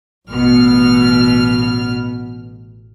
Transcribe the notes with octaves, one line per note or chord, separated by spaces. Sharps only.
A1 B2 F6